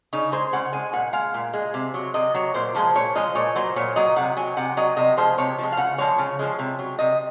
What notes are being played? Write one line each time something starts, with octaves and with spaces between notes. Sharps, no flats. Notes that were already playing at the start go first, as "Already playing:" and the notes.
C#3 D#4
G#3 C5
C#3 F#5
G#3 G#5
A#2 F#5
G#3 F5
A#2
G#3
C3
F#3
C3 D#5
F#3 C#5
A#2 C5
F3 G#3 C5
A#2 C#5
F3 G#3 D#5
A#2 C#5
F#3 C5
A#2 C#5
F#3 D#5
C3 F#5
F#3 G#5
C3 F#5
F#3 D#5
C3 D#5
F3 G#3 C5
C3 C#5
F3 G#3
F5
C#3 F#5
F3 G#3 C#5
C#3
F3 G#3
C3
F#3
C3 D#5